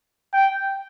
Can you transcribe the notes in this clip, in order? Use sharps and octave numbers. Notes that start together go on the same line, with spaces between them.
G5